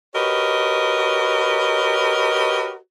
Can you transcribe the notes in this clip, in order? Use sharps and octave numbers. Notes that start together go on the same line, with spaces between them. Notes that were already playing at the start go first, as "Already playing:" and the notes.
F#4 G4 A#4 B4 C#5 D#5